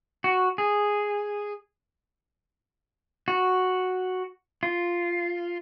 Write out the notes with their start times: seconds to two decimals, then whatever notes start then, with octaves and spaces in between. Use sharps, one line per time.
0.24 F#4
0.58 G#4
3.28 F#4
4.63 F4